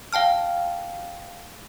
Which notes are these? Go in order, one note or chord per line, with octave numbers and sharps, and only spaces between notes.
F5 G5 A5 F6